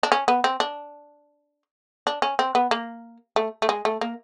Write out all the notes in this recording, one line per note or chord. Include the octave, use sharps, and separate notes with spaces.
D4
C#4
B3
C4
D4
D4
C#4
C4
B3
A#3
A3
A3
G#3
A3
A#3